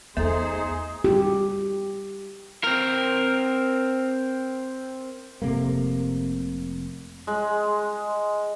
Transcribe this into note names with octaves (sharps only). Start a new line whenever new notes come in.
E2 A3 D#4 G#4 C5
G4
C4 A#4
F1 C3 A3 A#3
G#3